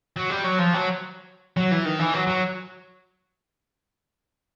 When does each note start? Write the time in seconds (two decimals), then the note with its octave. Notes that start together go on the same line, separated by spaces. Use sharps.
0.17 F#3
0.30 G3
0.45 F#3
0.59 F3
0.74 F#3
1.57 F#3
1.71 E3
1.85 D#3
1.99 E3
2.14 F#3
2.27 F#3